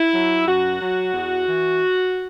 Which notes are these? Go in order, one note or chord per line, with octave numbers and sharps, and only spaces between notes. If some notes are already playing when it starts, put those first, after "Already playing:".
Already playing: E4
F#3
F#2 F#4
F#3
E2
E3